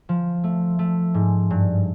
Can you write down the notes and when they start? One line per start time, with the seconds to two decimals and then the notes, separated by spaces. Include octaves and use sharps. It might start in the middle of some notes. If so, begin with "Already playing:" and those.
0.09 F3
0.44 A3
0.79 A3
1.14 G#2
1.50 G2